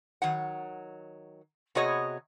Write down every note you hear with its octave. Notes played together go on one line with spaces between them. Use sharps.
D#3 F#3 F#5
C3 B3 F#4 G#4 C#5 D#5